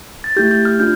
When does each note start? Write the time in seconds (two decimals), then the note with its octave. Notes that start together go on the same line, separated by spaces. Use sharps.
0.24 A6
0.36 A3 E4 G4 G6
0.51 G6
0.65 F6
0.79 D4 F4 G6